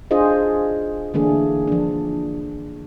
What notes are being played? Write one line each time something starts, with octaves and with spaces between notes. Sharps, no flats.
D4 F4 G#4 C5 D#5
D3 E3 A3 A#3 D4 G#4
F3 D4